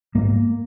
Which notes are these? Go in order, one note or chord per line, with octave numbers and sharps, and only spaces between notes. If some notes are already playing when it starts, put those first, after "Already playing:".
G#2 A#3